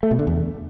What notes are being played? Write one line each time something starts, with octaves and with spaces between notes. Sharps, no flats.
A3
B2
D3
E2